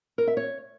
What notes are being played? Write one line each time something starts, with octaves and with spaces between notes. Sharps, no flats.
A#4
E5
C#5